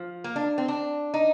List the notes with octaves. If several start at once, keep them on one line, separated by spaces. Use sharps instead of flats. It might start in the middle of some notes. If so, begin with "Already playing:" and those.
Already playing: F3
A#3
D4
C4
D4
D#4